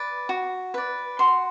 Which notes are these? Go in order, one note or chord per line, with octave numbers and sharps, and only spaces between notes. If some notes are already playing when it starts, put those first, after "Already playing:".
Already playing: B4 D5
F#4
B4 D5
F#4 C6